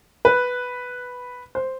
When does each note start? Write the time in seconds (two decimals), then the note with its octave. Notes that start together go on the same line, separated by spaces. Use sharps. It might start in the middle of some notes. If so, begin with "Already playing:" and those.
0.25 B4
1.55 C5